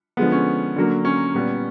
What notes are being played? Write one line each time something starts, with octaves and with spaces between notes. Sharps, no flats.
D3 F3 G#3 B3
C#4
D3 F#3 A#3
C#4
A#2 G3 B3